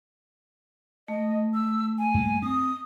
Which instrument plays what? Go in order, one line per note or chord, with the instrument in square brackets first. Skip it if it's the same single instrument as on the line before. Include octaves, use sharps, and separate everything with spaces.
[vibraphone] A3 [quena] D#5
[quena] E6
G#5
[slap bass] G2 A#3
[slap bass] C4 [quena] D#6